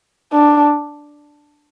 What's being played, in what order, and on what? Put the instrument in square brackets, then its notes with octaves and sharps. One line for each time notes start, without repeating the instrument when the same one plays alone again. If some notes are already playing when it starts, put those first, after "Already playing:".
[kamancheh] D4